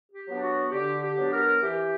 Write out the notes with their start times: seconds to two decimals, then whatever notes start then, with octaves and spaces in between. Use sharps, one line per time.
0.12 G4
0.27 F#3 B3 D4
0.42 F#4
0.71 D3 G4
1.01 G4
1.17 F#3 B3 D4
1.31 A#4
1.61 E3 G4